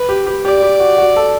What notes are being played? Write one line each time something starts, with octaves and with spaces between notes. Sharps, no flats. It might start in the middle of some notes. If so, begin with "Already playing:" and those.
Already playing: B4
G4
G4
G4 D5
G4
F#4
F#4
A4